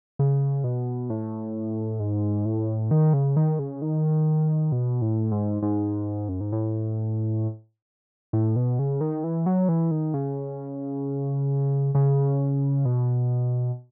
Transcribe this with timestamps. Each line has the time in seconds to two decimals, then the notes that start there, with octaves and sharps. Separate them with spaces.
0.19 C#3
0.64 B2
1.10 A2
2.00 G#2
2.45 A2
2.91 D#3
3.14 C#3
3.37 D#3
3.59 C#3
3.82 D#3
4.72 B2
5.02 A2
5.31 G#2
5.62 G#2
6.29 F#2
6.41 G#2
6.52 A2
8.33 A2
8.56 B2
8.79 C#3
9.01 D#3
9.24 E3
9.46 F#3
9.69 E3
9.91 D#3
10.14 C#3
11.95 C#3
12.85 B2